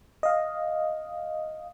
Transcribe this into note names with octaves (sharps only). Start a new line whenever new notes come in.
D#5 F5